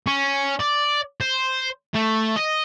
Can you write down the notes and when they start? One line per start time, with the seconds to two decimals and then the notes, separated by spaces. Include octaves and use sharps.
0.07 C#4
0.60 D5
1.21 C5
1.94 A3
2.36 D#5